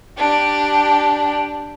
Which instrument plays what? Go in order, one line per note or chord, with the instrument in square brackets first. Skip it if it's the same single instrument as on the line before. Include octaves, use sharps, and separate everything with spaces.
[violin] D4 G4